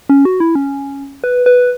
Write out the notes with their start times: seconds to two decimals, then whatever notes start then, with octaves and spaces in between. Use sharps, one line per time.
0.09 C#4
0.25 F#4
0.40 E4
0.55 C#4
1.24 B4
1.46 B4